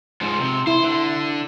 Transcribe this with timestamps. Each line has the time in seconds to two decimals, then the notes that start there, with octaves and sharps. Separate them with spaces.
0.21 G#2 F3
0.40 C3
0.67 E4 C5
0.84 D3